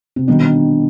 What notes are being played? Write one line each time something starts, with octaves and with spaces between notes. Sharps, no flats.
C3
B2 D#3 G3 D4